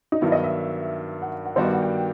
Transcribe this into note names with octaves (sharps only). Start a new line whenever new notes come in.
D#4
G2 D#3 F#3 B3 E4
D#5
E5
F#5
F#5
G2 D#3 G3 B3 F#4 C5
D#5
F#5
G5